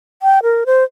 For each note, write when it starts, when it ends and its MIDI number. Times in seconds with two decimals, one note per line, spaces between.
0.22 0.39 79
0.43 0.64 70
0.66 0.84 72